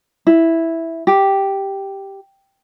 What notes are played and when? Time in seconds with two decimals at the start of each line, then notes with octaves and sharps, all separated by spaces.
0.27 E4
1.07 G4